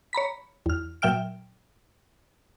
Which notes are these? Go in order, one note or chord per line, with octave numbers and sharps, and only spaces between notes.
C#5 A#5 B5 B6
E2 F6
A#2 F#3 E5 G5 F6 D7